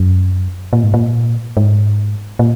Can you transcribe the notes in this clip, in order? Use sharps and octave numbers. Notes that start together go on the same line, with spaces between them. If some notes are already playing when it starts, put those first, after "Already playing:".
Already playing: F#2
A#2
G#2
A#2
G#2
A#2